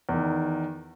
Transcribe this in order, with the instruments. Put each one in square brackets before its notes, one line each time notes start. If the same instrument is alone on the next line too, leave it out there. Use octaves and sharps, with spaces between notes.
[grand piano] E2 D#3